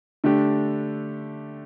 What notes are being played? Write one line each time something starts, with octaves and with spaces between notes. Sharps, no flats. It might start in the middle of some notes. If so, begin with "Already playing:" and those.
D3 A3 D4 G4